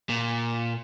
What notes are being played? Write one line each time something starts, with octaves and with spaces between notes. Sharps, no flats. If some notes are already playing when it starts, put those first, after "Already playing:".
A#2